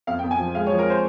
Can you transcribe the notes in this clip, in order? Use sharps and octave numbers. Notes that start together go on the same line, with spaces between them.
F2 F5
G5
F2
G#5
F3
G#3 F5
C#5
F3
A#4
C5